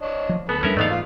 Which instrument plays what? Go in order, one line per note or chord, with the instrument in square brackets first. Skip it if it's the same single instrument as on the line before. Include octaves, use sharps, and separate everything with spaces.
[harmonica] D4 C#5 D#5
[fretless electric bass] F3
[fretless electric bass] D2 [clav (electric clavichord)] B3 [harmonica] A4 B4
[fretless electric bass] E2 G3 D4 [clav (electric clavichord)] C#4 A#4 E5
[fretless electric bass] G#2 E3 [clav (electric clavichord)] A3 B3 F5 [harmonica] D#4 D5
[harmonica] F4